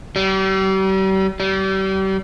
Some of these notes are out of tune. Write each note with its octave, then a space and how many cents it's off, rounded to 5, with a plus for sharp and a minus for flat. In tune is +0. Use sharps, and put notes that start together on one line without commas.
G3 -40
G3 -35